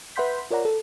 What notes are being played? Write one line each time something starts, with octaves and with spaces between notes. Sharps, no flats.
B4 E5 F#5 C6 G6 B6
F4 A#4 C#5 D5 F#5 A#5
A4